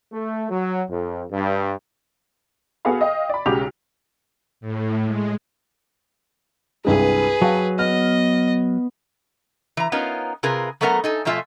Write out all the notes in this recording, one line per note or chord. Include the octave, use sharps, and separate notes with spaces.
A3
F#3
F2
G2
B3 F#4 G#4 A4 F5 B5
D#5 F5 G5
D5 B5
B1 C#3 G#3 F#4 G4 F7
A2
G#3
C2 G2 G#3 G#4 B4
F#3 F5 G5 A5
B3 D#5 F6
E3 A#5
B3 C#4 D#4 F4 A#4
C3 F4 G#4 A#4 B4
F#3 A3 B3 A#4 E5 F#5
D#4 A4 G#5
B2 F3 A3 F4 E5 G#5